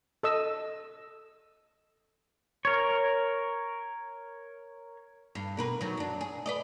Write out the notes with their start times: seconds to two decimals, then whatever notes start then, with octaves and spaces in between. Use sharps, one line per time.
0.23 A4 D#5 E6
2.65 A#4 C#5
5.35 G2
5.57 B2 A#4 B4
5.81 D#3 F#3
5.97 F#2 D4
6.21 G#4
6.46 B4 D5 D#5